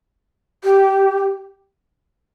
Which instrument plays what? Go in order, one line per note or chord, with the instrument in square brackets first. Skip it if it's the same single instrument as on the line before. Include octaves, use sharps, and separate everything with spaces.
[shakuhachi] G4